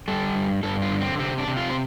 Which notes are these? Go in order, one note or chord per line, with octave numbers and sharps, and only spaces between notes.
G3 A4
G2
G2 A4
F4
D3
C4
C3 C4
D4
C3
F4
C5